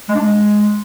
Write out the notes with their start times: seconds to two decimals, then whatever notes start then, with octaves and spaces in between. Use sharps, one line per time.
0.09 G#3
0.15 D4
0.21 G#3